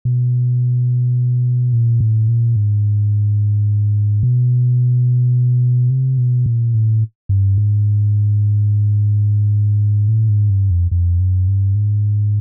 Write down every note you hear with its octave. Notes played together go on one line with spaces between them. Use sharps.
B2
A#2
A2
A#2
G#2
B2
C3
B2
A#2
A2
G2
G#2
A2
G#2
G2
F2
F2
F#2
G2
G#2